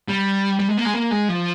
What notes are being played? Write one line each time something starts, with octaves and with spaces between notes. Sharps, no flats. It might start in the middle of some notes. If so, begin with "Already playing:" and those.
G3
G3
G#3
A#3
G#3
A#3
G#3
F3